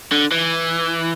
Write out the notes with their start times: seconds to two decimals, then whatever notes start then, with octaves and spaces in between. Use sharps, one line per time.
0.12 D3
0.31 E3